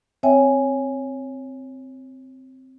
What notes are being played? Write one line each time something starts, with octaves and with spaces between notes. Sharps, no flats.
C4 C#5 E5 G5 G#5